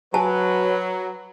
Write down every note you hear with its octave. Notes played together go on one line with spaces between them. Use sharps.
F#3 B4 G#5 A5